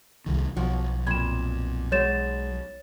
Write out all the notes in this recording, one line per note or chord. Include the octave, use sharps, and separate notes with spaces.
C2 D#3
B1 F3 F#4
F2 A#2 B5 G#6 E7
F#3 G#3 C#5 A6 E7